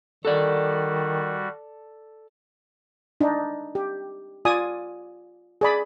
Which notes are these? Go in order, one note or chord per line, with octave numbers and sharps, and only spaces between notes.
D#3 G3 F#4 A4 D5
D4 D#4
G4
F4 D5 G#5 D#6
G#4 D5 B5